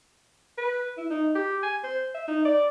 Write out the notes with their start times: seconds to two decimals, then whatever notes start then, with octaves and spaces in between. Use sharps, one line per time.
0.58 B4
0.97 E4
1.10 D#4
1.35 G4
1.63 G#5
1.84 C5
2.15 E5
2.28 D#4
2.45 D5